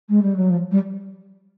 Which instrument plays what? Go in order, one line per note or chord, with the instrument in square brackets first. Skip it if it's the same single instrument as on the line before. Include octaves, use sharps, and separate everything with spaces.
[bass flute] G#3
G3
F#3
F3
G3